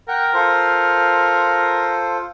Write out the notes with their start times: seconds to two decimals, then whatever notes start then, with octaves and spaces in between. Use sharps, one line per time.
0.08 A#4 F#5 G5
0.34 F4 A4 C5